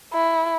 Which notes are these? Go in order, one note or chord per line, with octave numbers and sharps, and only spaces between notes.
E4